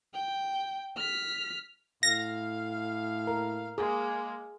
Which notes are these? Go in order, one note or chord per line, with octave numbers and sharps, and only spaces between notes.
G5
F6 B6
A2 F5 A#6
A#4
G#3 A#3 G#4